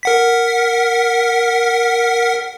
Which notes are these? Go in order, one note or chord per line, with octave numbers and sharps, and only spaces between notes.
A#4 F#5 B6